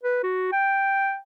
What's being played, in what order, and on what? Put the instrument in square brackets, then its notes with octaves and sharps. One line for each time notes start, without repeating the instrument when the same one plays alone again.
[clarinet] B4
F#4
G5